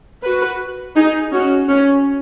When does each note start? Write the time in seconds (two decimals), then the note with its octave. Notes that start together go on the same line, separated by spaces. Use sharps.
0.23 F#4 B4
0.96 D#4 G#4
1.32 C#4 F#4
1.69 C#4